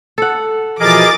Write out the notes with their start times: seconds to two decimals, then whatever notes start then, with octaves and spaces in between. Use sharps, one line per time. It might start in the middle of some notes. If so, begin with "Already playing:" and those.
0.18 A4 F#5
0.80 B2 E3 F3 G#4 A#4 D#5 D6 A6